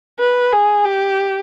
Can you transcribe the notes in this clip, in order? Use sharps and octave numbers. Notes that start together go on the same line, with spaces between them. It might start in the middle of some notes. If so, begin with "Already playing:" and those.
B4
G#4
G4